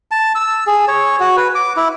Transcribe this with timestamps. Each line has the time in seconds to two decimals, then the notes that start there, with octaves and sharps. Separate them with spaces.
0.11 A5
0.35 E6
0.67 G#4
0.88 C#5
1.20 F#4
1.37 B4
1.55 D6
1.77 E4